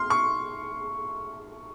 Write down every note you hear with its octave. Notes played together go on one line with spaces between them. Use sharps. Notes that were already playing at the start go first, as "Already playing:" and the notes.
Already playing: C6 F6
C#6